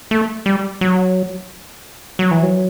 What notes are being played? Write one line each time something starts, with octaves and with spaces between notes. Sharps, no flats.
A3
G3
F#3
F#3
E3
F#3